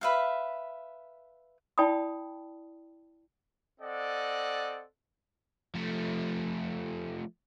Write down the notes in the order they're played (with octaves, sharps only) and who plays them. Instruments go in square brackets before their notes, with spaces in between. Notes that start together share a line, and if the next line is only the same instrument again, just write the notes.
[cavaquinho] B4 E5 F5
[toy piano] E4 D5 G5 A5 B5 D#6
[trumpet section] C4 A4 D5 D#5 F#5
[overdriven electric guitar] F3 A3